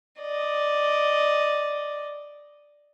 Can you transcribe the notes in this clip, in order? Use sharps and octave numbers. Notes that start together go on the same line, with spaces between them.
D5 D#5